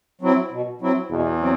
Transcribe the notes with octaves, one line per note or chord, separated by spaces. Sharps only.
F#3 C4 E4
B2
F#3 C4 E4
E2 B2
F#3 C4